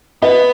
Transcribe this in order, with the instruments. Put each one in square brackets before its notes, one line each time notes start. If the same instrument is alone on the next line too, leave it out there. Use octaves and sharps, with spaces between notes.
[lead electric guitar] B3 [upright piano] B4 D#5